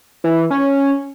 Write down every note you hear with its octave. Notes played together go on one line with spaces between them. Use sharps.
E3
C#4